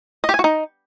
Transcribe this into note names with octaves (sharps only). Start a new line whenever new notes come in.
D#5
G4
G#5
F#4
D#4